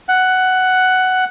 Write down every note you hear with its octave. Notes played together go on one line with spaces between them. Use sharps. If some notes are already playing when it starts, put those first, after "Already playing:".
F#5